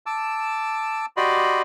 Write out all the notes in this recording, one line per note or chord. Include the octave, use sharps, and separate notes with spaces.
A5 D6 E6
F#4 G4 D5 D#5 B5 C6